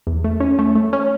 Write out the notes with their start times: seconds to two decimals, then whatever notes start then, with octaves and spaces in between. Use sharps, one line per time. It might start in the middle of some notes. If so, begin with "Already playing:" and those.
0.07 E2
0.24 A3
0.40 C#4
0.59 A3
0.75 A3
0.93 C#4